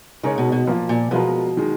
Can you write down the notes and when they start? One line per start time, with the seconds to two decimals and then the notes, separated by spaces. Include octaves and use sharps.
0.23 C#3 G#3 D#4 A#4 C#5
0.38 B2
0.52 B2
0.67 A#2 F3 A#3 F4
0.89 A#2
1.11 B2 F3 G#3 B3 F4 A#4
1.57 D#3 G#3